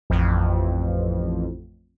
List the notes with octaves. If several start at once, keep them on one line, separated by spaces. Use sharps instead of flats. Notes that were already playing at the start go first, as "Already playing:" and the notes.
A1 F2